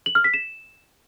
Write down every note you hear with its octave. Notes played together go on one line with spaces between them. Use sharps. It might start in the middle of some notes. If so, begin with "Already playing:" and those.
F#7
F6
B6
E7